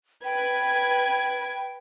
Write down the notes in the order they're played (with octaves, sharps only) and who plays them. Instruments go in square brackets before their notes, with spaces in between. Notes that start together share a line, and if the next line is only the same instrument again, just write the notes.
[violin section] B4 G#6 [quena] G5